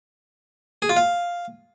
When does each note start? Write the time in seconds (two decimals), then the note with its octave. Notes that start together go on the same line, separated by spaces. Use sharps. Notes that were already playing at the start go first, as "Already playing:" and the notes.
0.82 G#4
0.89 F4
0.97 F5